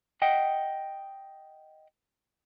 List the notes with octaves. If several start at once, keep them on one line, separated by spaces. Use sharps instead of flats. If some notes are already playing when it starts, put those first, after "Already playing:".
D#5 F#5 G5